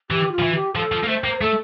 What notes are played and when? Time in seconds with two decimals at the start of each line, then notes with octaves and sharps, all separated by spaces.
0.10 E3 G4
0.32 F4
0.39 F3
0.42 E3
0.54 G4
0.75 F3 A4
0.92 F3
1.04 A#3
1.08 A3 C5
1.24 A#3
1.41 A3 A4